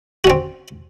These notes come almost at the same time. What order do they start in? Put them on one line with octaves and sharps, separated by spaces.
F#4 C#4 C4